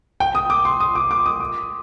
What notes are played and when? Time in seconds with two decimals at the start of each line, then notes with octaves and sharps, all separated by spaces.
0.20 G5
0.35 D#6
0.50 D6
0.65 C6
0.80 D#6
0.95 D6
1.11 D6
1.26 D#6
1.40 D6